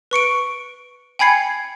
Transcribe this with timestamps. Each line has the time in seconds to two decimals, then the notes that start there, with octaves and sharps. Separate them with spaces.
0.11 B4 C#6 C#7 D7
1.19 G5 G#5 B5 G#6 C7 C#7